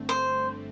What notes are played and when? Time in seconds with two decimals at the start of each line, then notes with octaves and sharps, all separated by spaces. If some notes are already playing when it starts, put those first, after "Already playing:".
Already playing: G1 G2 D3 A3 C4
0.09 C5